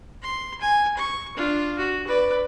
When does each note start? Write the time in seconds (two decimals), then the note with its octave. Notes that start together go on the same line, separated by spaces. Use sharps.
0.22 C6
0.61 G#5
0.97 C#6
1.36 D4 F4
1.78 F#4
2.07 B4 D5